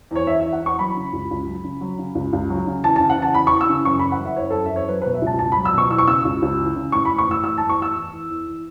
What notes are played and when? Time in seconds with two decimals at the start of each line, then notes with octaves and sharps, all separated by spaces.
0.11 E2 C#5
0.27 E3 E5
0.40 E2 E5
0.53 F#5
0.61 E3 C#6
0.79 F#3 B5
0.96 C#3
1.13 C#2
1.31 C#2
1.47 F#3
1.64 C#3
1.81 F#3
1.99 C#3
2.15 C#2
2.33 C#2
2.50 F#3
2.67 C#3
2.83 E3 A5
2.96 C#3 A5
3.10 F#5
3.17 E2
3.22 A5
3.34 E2 B5
3.47 E3 C#6
3.61 E6
3.69 C#3
3.85 F#2 C#6
3.99 E3 B5
4.12 F#5
4.20 F#2
4.25 E5
4.37 E3 C#5
4.50 F#2 A4
4.66 E5
4.71 E3
4.76 C#5
4.89 F#3 B4
5.02 B2 B4
5.14 E5
5.22 C#2 A5
5.39 C#2 A5
5.52 F#3 B5
5.65 E6
5.74 B2 C#6
5.90 E3 E6
5.98 C#6
6.07 C#3 E6
6.25 C#2
6.42 C#2
6.58 E3
6.76 C#3
6.92 A2 C#6
7.05 B5
7.11 E3
7.18 C#6
7.28 A2 E6
7.44 E3 E6
7.58 A2 A5
7.69 C#6
7.79 E3 E6
7.95 E2
8.12 E3
8.30 E2
8.47 E3